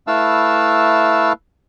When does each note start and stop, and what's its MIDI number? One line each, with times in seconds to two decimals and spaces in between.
0.07 1.33 57
0.07 1.33 64
0.07 1.33 71
0.07 1.33 77
0.07 1.33 81
0.07 1.33 88